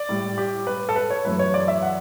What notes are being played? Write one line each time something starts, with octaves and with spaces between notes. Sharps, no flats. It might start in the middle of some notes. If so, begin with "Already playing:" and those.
Already playing: D5
A2 G3
G4
B4
A4
B4
C#5
F#2 E3 A3 B4
C#5
D5
E5
F#5